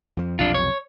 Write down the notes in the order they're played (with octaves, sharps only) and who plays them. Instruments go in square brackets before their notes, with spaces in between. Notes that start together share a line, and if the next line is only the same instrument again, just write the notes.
[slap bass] F2 F3
[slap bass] B1 F2 C3 [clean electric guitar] D4 F4
[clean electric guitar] C#5